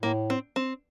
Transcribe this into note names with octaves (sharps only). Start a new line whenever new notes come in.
A2 A#3
C4
C4